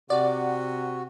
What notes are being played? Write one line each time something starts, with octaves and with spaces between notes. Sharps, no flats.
C3 F#4 D5 F#5